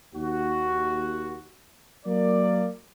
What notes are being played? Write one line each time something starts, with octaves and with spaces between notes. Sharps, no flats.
D#2 F#4
F#3 A#3 D5